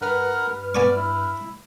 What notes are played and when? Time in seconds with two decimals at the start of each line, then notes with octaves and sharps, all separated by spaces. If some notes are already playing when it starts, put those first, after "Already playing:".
0.01 G2 A#4 B4 F#5 F6
0.75 B3 D5 G#5 C#6
0.96 E4